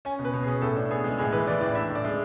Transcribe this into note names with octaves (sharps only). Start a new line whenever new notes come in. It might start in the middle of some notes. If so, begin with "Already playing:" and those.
C#4 G#5
B2
B4
B2
G#4
C#4
A2 A4
D4
B3 G#4
G#3 G#4
A2 G#4
E3 B4
E3 D5
A2 D5
D4 E5
A2
D5
G#3